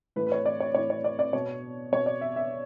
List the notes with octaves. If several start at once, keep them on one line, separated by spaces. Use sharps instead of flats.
A2 E3 B4
B4
C#5
D5
C#5
A2 E3 C#5
C#5
D5
D5
B2 C#5
B2 C#5
D5
E5
E5